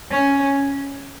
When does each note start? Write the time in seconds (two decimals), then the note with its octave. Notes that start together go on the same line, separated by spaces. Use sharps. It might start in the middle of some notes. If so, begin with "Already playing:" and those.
0.11 C#4